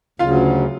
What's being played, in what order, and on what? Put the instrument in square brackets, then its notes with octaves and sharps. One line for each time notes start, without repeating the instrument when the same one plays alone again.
[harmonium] D2 C#3 F#3 [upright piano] F4 F5